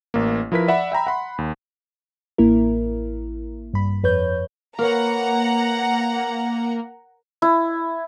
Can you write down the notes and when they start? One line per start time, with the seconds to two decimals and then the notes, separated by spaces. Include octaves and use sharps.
0.14 A1 A#3
0.52 F3 E4 A#4 B4 B6
0.68 D5 E5 F#5 B5
0.92 E5 G5 A#5 B5
1.07 F#5 B5 C6
1.38 D#2
2.38 A1 A#3 E4 A#4
3.73 G2 B5
4.04 F2 B4 C#5 G6
4.78 A#3 A#4 B4 C#5 F#5 A#5
7.42 E4